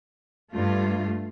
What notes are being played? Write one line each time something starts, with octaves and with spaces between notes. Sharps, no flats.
G2 A3 F4